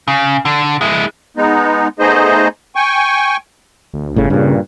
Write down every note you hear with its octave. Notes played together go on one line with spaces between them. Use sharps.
C#3
D3
G#3 E4
G#3 B3 D#4
A3 B3 D#4 G#4 C5 D#5
G5 G#5 C#6
D2
G1 A2 C#3
G2 A#2 C#3